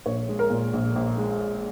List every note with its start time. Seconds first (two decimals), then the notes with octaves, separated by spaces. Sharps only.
0.06 A#1 C#5
0.28 G#3
0.39 A#4
0.50 A#2
0.73 A#1
0.96 A#1
1.18 G#3